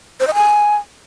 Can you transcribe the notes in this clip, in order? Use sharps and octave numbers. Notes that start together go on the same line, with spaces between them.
C5
D#5
G#5